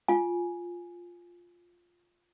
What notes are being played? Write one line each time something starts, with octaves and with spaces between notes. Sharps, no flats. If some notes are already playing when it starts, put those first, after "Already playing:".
F4 G#5